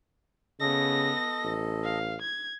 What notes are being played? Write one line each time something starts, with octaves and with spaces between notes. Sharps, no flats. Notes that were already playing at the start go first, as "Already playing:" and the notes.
C#3 B3 A4 D#5 A#6
A1
F5
G#6